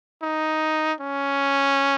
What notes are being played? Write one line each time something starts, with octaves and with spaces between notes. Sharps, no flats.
D#4
C#4